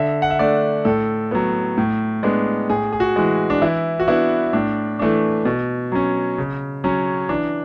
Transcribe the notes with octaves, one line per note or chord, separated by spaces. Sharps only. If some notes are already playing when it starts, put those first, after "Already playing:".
Already playing: D3 E5
F#5
E5
A3 D4 D5
A2 A4
F#3 B3
A2
G#3 B3 D4
A2 G#4
G#4
F#4
E3 G#3
D4
E3 E4
F#4
B3 D4 E4
A2 D4
E3 A3 D4
B2
F#3 C#4
C#3
F#3 C#4
E3 D4